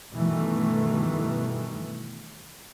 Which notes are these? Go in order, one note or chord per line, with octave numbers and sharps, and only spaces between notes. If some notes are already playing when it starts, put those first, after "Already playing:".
G2 B2 D#3 E3 A3